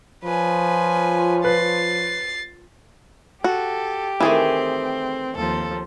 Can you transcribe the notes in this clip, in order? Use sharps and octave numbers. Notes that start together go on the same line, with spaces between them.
F3 F4 B4 C#5 G#5
B4 A6 C7
F#4 G4 A4
D#3 E3 A3 C4 G#4
D#2 F3 A4